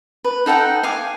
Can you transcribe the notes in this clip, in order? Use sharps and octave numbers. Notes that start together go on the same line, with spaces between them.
B4
D#4 A4 F#5 G5
F5 G#5 D6